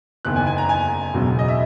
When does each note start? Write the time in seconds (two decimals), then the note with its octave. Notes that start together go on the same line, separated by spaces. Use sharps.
0.25 F#1 E2 D#3 F#6
0.36 G#5
0.47 G#5
0.58 A#5
0.69 G#5
1.14 E1 E2 C#3 F#3
1.39 D#5
1.48 E5